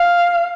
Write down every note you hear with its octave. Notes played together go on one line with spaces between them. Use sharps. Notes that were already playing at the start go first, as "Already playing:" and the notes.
Already playing: F5